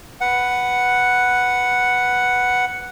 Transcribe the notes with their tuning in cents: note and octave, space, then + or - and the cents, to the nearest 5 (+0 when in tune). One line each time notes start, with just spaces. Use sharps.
B4 +0 F#5 +0